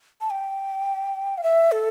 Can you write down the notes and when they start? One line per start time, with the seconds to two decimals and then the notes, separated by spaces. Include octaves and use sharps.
0.21 A5
0.30 G5
1.38 F5
1.43 E5
1.72 A4